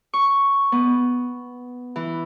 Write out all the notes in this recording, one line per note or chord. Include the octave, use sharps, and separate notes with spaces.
C#6
B3
E3